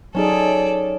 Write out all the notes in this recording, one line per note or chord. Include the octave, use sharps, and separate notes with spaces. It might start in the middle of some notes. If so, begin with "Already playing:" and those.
F#3 C#4 D#4 G#4 A4 D5